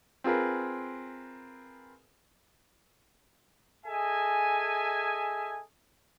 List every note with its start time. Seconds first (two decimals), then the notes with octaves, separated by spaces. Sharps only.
0.24 C4 F4 G#4 A#4 B4
3.86 G#4 A4 D#5 E5 G#5